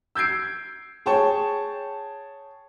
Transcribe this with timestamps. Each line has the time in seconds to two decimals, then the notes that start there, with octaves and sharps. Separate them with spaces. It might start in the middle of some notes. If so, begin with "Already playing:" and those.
0.15 E6 G6 G#6 C7 D7
1.06 G#4 C#5 G5 A5 C#6